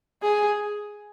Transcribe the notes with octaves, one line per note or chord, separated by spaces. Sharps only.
G#4